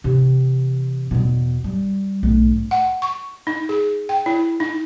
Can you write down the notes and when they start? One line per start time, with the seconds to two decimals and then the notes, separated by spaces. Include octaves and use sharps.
0.04 C3 E3
1.11 E2 B2
1.64 G3
2.23 B1 A2
2.71 F#5
3.02 C#6
3.47 D#4
3.69 G#4
4.09 G5
4.26 E4
4.60 D#4